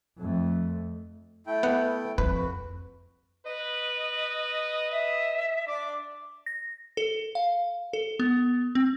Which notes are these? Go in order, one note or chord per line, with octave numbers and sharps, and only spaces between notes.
F2 A3
A3 E4 G5
B3 F#5
F2 B4
F#4
B4 D#5
D#5 E5
D4 D5 D6
A#6
A4
F5
A4
B3
C4